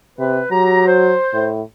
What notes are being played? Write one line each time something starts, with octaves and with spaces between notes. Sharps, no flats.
C3 B4
F#3 G4 A#5
C5
A2